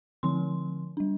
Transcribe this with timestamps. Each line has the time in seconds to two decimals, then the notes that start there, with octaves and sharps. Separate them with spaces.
0.23 D3 F3 C4 C6
0.97 G3 D4